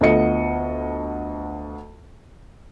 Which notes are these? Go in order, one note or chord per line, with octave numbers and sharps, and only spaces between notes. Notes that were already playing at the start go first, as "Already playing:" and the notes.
D2 B3 F4 A4 D#5 C#7